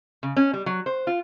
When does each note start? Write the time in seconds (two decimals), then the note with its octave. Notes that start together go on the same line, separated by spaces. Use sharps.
0.23 C#3
0.37 C#4
0.53 G3
0.66 F#3
0.86 C5
1.07 F4